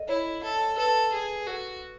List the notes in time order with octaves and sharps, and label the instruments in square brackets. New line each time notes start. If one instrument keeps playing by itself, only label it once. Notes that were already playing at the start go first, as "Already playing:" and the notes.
Already playing: [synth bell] A4 D#5
[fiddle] E4 [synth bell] C#5
[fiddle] A4
[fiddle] A4 [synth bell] B4
[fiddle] G#4
[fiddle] F#4 [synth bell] A4